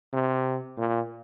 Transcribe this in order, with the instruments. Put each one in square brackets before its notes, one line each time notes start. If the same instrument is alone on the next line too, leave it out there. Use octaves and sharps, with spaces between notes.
[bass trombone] C3
A#2